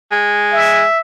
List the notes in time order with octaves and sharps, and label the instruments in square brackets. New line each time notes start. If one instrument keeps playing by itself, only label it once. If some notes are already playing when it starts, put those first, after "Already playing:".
[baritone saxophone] G#3
[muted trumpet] E5